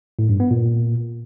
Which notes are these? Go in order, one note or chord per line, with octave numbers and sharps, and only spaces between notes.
A2
G2
B3
A#2